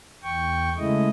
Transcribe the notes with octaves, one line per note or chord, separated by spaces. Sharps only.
E2 G5 C#6
C#3 G#3 A3 E4 D#5